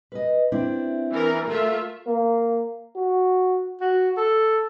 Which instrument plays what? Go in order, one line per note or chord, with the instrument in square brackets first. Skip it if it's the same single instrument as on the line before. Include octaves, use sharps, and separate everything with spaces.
[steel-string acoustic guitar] B4 D#5
C4 D4 E4
[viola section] E3 A#4
[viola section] A3 F4 E5 [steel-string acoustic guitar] A#4
[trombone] A#3
F#4
[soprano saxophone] F#4
A4